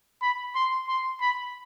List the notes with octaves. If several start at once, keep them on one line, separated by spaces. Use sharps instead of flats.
B5
C6
C6
B5